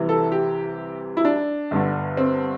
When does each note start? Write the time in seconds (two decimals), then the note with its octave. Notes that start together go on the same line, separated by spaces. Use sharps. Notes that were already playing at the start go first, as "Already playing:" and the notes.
Already playing: C2 C3 E3
0.09 A4
0.32 G4
1.17 E4
1.25 D4
1.71 G1 G2 D3
2.17 C4